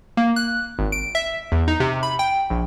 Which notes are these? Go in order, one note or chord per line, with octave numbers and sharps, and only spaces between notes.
A#3
F#6
G#1
D7
E5
E2
D#4
C3
B5
G5
A#1